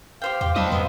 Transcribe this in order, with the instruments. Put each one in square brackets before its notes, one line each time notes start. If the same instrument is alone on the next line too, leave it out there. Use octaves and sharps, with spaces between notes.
[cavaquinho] G4 C5 G5 [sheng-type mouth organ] F5
[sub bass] E2 [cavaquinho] G4
[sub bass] F#3 [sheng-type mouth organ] D4 D#6 E6 [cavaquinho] C5 B5 [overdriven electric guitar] D#5 F5
[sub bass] F2 [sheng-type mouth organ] B3 [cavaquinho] C5